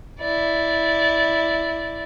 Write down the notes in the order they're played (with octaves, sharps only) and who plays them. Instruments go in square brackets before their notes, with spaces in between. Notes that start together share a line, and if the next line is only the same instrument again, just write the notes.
[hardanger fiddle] E4 D5